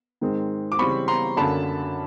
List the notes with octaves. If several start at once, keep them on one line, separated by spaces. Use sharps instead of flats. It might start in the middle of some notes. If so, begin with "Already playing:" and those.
G#2 D#3 G#3 C4 D#4
D6
C#3 E3 G3 C4 B5 C#6
A#5 C6
F#2 D3 F#3 A#3 C#4 A5 B5